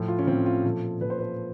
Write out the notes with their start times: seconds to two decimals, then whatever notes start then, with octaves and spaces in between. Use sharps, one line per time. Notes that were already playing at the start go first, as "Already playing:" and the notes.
Already playing: A2 F3
0.08 F4
0.19 C#4
0.27 F3 C4
0.32 A2
0.46 F4
0.64 A#2 F3 A4
1.01 A#2 F3 B4
1.10 C5
1.19 B4